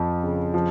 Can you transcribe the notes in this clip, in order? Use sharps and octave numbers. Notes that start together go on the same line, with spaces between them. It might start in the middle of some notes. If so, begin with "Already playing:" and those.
Already playing: F2 F3
C#3
F3